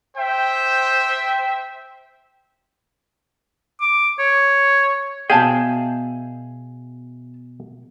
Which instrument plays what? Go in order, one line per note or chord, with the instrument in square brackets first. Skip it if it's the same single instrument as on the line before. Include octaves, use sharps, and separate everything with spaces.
[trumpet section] C5 E5 G5
[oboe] D6
C#5
[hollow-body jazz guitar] B2 G5 [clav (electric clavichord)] G#4 [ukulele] E5 F5 A5